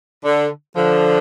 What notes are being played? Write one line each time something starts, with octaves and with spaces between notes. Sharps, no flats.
D3
D3 F3